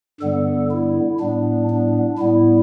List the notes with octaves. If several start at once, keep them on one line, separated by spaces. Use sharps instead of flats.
G2 D3 G3 B3 A4
E4
A2 G3 B3 D4
D4
A2 G3 B3 E4